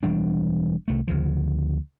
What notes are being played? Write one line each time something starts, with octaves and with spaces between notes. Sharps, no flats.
E1 E3 G3 D4
C2 A3
D2 C#3 F3